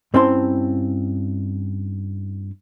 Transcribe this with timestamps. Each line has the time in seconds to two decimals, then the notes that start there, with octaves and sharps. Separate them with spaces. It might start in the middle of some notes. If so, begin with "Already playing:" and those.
0.14 G2 C4 C#4 E4 A5 C6